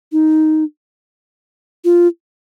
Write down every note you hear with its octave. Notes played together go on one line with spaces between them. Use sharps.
D#4
F4